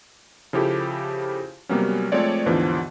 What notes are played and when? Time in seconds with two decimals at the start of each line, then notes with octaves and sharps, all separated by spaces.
0.53 C#3 F3 E4 G4 A4
1.69 C3 F#3 G3 A#3 B3 C#4
2.12 F3 G#3 A3 C4 C#5 D5
2.46 D#2 G#2 D3 E3 F3 B3